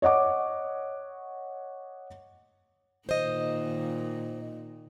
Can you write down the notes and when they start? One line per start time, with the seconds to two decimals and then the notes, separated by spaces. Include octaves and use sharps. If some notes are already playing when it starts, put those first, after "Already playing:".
0.02 C#5 D#5 F#5 D6
3.09 A#2 D#3 C5 D#5